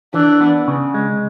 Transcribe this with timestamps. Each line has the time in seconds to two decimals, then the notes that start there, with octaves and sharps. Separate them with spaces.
0.14 E3 D4
0.41 B3
0.68 C#3
0.94 G#3